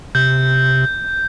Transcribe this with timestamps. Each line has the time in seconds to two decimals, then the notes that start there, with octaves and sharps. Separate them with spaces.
0.15 C3 G6